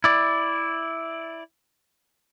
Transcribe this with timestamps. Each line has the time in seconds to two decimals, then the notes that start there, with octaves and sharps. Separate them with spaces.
0.04 E4 D5